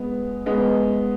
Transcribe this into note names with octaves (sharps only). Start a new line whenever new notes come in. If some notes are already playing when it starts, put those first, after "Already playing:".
Already playing: G#3 B3
G#3 B3